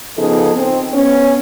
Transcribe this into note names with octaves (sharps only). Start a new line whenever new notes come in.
C#3 F3 B3 D#4 G#4 A4
C4
B3 C#4